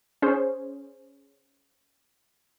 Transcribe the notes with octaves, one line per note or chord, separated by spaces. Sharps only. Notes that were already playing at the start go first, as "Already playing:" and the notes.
C#4 G#4 C5